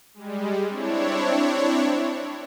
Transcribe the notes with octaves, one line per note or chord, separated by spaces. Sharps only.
G3 G#3
C4 D4 E4 C#5